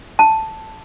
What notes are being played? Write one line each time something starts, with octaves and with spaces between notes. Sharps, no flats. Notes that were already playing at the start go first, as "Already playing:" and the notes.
A5